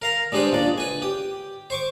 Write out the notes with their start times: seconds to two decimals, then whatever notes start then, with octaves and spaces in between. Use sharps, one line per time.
0.02 A#4 F5 A#5
0.32 G3 G#3 D4 B4 C5
0.52 C#2 A#2 D4 D5
0.78 B4 G#5
1.02 G4
1.70 C5 C#6 D6